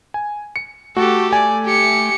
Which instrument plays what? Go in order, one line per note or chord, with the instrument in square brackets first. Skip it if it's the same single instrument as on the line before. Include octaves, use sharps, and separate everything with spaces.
[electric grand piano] G#5
C#7
[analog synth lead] A3 [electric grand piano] F#4 [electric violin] G4 A4
[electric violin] D5 [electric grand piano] G#5
[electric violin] G4 C#7